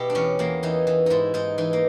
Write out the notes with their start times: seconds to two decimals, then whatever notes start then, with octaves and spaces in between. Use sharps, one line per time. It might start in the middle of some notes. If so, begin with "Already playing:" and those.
Already playing: B2 E4 G4
0.10 D4
0.15 E2 C#4
0.39 E2 A#3
0.63 E3 D#4
0.87 E3
1.06 G#2 D#4 E4
1.34 G#2 D#4
1.58 E3 D#4
1.73 A#3